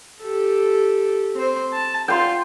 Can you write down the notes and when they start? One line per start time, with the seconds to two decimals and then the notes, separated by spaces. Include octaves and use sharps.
0.22 G4 A4
1.35 C4 C5
1.73 A5
2.08 F4 G5 C6